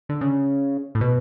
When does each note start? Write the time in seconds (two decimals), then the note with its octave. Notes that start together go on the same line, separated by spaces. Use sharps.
0.09 D3
0.21 C#3
0.95 A2
1.01 B2